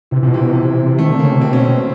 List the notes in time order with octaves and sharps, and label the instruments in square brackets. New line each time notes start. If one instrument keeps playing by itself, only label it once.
[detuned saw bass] C3 [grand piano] E3
[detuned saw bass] C3 [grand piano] F3
[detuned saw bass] B2
[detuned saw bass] C3 [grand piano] E3
[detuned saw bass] B2
C3
[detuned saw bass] D#3 [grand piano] A3
[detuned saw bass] D3
[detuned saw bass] C#3 [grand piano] A#3
[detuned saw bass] C3
[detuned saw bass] B2 [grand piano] C4
[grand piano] C#4
C4